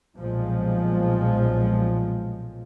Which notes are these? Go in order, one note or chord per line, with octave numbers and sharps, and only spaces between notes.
B1 A#2 F3 G#3